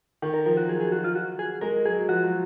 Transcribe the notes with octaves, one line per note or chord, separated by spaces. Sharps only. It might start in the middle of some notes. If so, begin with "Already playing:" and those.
D#3
A#4
F3 A#4
F#4
F#3 G#4
G#4
F#4
F4
F#4
G#4
G#3 A#4
F#3 G#4
F3 F#4
F#3